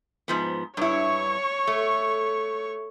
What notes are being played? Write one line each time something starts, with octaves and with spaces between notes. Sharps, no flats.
G#2 F3 B3
G2 E4 C#5 C#6
A3